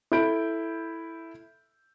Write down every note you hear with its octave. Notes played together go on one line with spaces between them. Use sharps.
E4 A4 B5 G6 D7